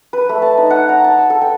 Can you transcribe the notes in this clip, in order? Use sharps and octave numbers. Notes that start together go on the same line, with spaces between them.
B4
A3
A5
D#4
F#5
A#5
A5
E6
A4
G5